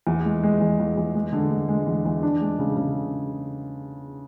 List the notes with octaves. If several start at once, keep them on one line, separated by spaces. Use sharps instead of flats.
E2
G#3
G#3
E2
E2
E2
G#3
D3
G#3
G#3
E2
E2
D4
G#3
C#3
C#3